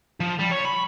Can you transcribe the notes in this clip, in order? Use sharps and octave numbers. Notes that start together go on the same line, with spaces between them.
F3
G3
C#5
B5